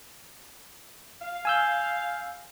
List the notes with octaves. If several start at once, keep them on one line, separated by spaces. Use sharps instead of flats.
F5
G#5 E6 G6